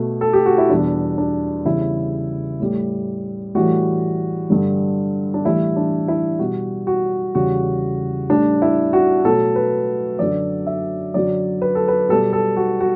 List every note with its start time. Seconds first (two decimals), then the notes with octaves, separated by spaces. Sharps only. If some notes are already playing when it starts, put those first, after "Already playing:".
Already playing: B2 A3
0.21 A4
0.33 G4
0.46 F#4
0.58 E4
0.70 E2 B2 G3 D4
1.18 D4
1.65 E2 C#3 G3 E4
2.60 A2 G3
3.55 A2 E3 G3 F#4
4.50 G2 D3 G3
5.34 D4
5.45 A2 E3 G3 E4
5.76 D4
6.08 E4
6.39 B2 G3 F#4
6.87 F#4
7.35 E2 C#3 G3 F#4
8.30 A2 G3 D4
8.62 E4
8.93 F#4
9.25 B2 F#3 A3 A4
9.56 B4
10.19 F#2 D3 F#3 D5
10.67 E5
11.14 F#2 D3 F#3 D5
11.62 B4
11.75 A4
11.88 B4
12.09 B2 A4
12.13 G3
12.33 A4
12.57 F#4
12.80 F#4